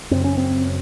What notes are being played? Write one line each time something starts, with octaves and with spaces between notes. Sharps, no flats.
F#2 C#3 C4
C#4
C4